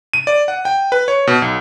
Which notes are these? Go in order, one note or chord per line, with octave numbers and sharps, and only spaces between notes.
D#7
D5
F#5
G5
B4
C#5
B2
B1